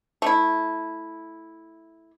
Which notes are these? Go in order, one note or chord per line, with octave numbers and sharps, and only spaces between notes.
A3 E4